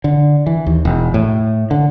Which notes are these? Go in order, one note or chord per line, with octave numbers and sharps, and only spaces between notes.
D3
E3
D#2
E1
A2
D3